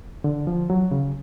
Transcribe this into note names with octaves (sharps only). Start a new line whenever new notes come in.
D3
F3
F#3
C#3